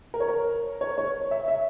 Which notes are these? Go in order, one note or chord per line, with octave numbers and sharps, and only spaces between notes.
A#4
C#5
A#4
C#5
C#5
E5
E5